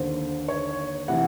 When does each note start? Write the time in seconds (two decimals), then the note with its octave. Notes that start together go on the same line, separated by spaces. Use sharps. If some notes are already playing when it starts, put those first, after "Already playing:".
Already playing: D#2 D3 C5
0.48 C#5
1.08 C3 E3 F#5